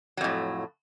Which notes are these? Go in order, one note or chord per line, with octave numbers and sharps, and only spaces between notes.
F2 A2 F#3